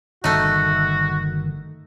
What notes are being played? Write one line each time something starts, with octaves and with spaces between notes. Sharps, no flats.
G1 A#2 D#3 A3 D#4 F#4